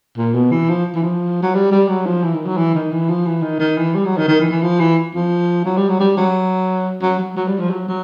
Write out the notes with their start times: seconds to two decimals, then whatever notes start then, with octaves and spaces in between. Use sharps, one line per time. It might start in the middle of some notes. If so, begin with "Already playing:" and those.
0.18 A#2
0.34 B2
0.52 E3
0.69 F3
0.95 E3
1.03 F3
1.43 F#3
1.55 G3
1.72 G3
1.89 F#3
2.06 F3
2.24 E3
2.35 D#3
2.46 F#3
2.58 E3
2.75 D#3
2.92 E3
3.09 F3
3.27 E3
3.43 D#3
3.60 D#3
3.78 E3
3.95 G3
4.05 F#3
4.18 D#3
4.28 D#3
4.41 E3
4.51 E3
4.63 F3
4.80 E3
5.15 F3
5.65 F#3
5.77 G3
5.89 F#3
6.00 G3
6.17 F#3
7.02 F#3
7.19 F#3
7.37 F#3
7.48 G3
7.59 F3
7.71 F#3
7.88 F#3